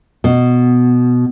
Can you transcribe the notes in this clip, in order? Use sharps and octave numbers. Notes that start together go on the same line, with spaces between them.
B2